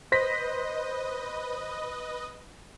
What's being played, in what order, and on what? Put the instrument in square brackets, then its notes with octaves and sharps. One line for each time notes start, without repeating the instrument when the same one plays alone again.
[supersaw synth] B4 D#5 [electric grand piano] C5 A#6 B6